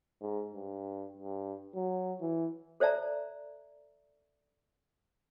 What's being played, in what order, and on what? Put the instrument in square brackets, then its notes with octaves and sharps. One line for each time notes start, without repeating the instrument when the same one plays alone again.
[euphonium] G#2
G2
G2
F#3
E3
[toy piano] A4 C5 D5 E5 A5 A#5